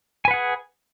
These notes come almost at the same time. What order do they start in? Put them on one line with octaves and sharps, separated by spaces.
G#5 B4 F#5 G#4